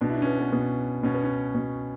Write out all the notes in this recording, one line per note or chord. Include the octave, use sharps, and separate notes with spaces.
B2 D4
E4
D4
C#4
B3
B3
B2 B3
B2 C#4
B3
C#4
B2